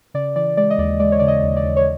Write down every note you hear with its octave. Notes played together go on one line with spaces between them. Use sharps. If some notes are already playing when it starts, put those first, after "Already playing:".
C#3 D5
E3 D5
G#3 D5
D#5
D#2 D5
G#3 D5
C#5
C#3 D5
D#5
D#2
D5
D#2
C#5